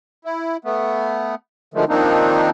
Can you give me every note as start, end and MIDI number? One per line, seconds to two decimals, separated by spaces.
0.25 0.57 64
0.65 1.35 57
0.65 1.35 59
1.74 1.85 50
1.74 1.85 51
1.74 1.85 53
1.74 1.85 56
1.74 1.85 57
1.89 2.50 51
1.89 2.50 53
1.89 2.50 58
1.89 2.50 60
1.89 2.50 62
1.89 2.50 63